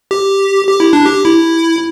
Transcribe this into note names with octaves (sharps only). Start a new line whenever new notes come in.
G4
G4
E4
D4
G4
E4